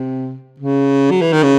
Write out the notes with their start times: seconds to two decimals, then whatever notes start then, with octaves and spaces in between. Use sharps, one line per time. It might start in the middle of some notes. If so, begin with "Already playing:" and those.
Already playing: C3
0.60 C#3
1.11 F#3
1.21 E3
1.33 D#3
1.43 C#3